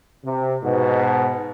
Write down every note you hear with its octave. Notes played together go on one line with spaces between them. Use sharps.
C3
G#2 B2